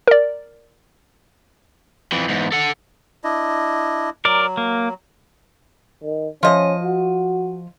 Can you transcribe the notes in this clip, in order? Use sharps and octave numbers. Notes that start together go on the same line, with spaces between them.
A#4 D5
F2 E3
E2 G#2
A4 F#5
D4 E4 D#5
F#3 A#4 D5
A#3
D#3
F3 C#4 D#5
F#4